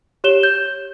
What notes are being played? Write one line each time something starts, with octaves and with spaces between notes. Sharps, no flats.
G4 C#5 E7 G7
G6